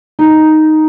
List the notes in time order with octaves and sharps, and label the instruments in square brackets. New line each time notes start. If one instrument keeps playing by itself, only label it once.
[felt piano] D#4